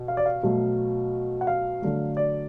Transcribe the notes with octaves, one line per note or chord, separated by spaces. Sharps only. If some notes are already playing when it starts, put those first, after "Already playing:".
Already playing: B2
F5
D5
F5
B2 F#3 A3
F#5
F5
D3 F#3 A3
D5